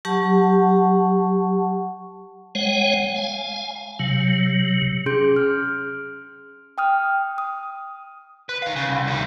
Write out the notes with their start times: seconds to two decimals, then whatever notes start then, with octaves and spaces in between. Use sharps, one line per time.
0.05 F#3 G4 F#5 A5 C#6
2.55 G#3 C#5 F#5 G5
3.16 F5 G#5
3.99 C3 F#3
5.06 C#4 G#4 C6 G6 D7
5.36 F6
6.78 G5 D#6 F6
7.38 D#6
8.49 B4
8.62 D#3 F5
8.76 C#3
8.88 C2
9.07 D2 D#3